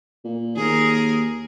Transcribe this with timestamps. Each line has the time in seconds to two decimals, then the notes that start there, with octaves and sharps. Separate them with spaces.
0.25 A#2
0.56 D#2 G#4 A#4